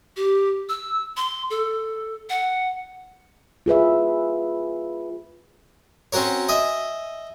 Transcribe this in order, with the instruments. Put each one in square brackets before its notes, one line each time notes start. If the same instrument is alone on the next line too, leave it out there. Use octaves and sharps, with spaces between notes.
[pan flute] G4
E6
C6
A4
F#5
[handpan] F4 G#4 B4 E5
[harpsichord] C4 C#4 F#4 A#4 C#5
D#5 E5 G#5